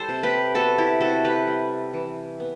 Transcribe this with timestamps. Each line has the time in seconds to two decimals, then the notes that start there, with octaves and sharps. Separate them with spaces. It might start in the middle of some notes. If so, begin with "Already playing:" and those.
Already playing: G3 A4 C5
0.09 C3
0.23 G4 B4
0.55 B3 F#4 A4
0.78 E4 G4
1.01 C3 F#4 A4
1.25 G4 B4
1.47 G3
1.93 E3
2.40 B3